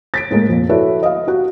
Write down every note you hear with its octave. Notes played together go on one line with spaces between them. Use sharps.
A6 B6 D7
A2 G#3 A#3
F2 A#2
E4 F#4 A4 B4 C#5 D5
D#5 F5
F#4 G4